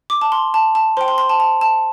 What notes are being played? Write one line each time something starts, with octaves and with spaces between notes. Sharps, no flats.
D6
A5
C6
A5
A5
C5 G5 C6
C6
C6
A5
A5
A5